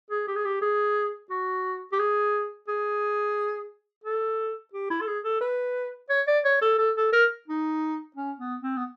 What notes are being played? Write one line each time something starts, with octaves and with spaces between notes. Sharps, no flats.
G#4
G4
G#4
G4
G#4
F#4
G4
G#4
G#4
A4
G4
E4
A4
G#4
A4
B4
C#5
D5
C#5
A4
A4
A4
A#4
D#4
C#4
B3
C4
B3